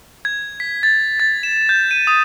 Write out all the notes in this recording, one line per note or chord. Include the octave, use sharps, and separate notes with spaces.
G#6
B6
A6
A6
E7
G6
D#7
D#6